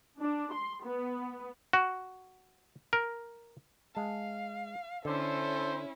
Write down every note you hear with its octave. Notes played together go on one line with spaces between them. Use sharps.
D4
C6
B3
F#4
A#4
G#3 F5 A5
D3 C#4 E4 A4 C5